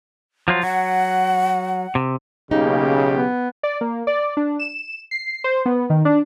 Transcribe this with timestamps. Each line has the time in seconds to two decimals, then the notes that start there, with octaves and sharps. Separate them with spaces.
0.48 F3 F#3 F4
0.63 F#3 F#5
1.95 C3
2.51 B1 C#3 A#3 D#4 G4
3.14 B3
3.63 D5
3.81 A#3
4.07 D5
4.37 D4
4.59 E7
5.11 C7
5.44 C5
5.66 B3
5.90 D#3
6.05 D4